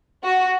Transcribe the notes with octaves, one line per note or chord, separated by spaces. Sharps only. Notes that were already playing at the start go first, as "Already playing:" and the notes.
F#4